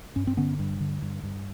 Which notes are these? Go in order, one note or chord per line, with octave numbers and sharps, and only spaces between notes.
G2 C#4
C4
D3 B3 C#4
G2
D3
G2
G2